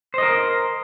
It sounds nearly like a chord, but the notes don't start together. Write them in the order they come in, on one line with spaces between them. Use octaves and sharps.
C5 D#5 A#4